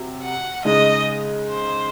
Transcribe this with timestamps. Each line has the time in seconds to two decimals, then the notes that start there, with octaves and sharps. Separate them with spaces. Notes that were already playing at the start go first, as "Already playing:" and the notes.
Already playing: C3 F#3
0.23 F#5
0.65 C#3 G#3 D#4 D#5
1.49 C5